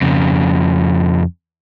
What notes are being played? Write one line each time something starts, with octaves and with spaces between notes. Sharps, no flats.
F2 C#3